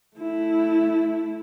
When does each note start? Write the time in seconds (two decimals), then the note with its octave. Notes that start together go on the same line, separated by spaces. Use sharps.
0.17 A3 E4